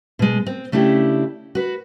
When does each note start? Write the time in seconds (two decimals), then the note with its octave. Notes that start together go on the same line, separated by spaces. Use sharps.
0.19 B2 G#3
0.47 C4
0.72 C#3 A3 D4 E4 G4
1.55 F#4 B4